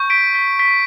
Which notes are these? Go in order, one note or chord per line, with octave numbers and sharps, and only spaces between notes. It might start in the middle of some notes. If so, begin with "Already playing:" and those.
Already playing: C#6 G6
B6 D7
B6
B6